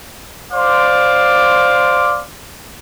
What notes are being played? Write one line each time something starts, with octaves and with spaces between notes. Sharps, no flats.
C5 D5 F5 C6 D6